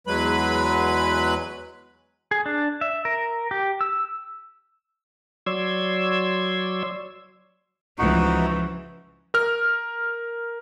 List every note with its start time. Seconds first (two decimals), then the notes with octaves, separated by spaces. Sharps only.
0.07 E2 F#3 G#3 B4 B5
2.31 G#4
2.46 D4
2.81 E5
3.05 A#4
3.51 G4
3.81 E6
5.46 F#3 C#5 D5 C6 E6 G#6
7.98 C#2 E3 F3 D#4 F#4
9.34 A#4 F6